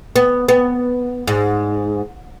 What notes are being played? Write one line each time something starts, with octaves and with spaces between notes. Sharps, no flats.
B3
B3
G#2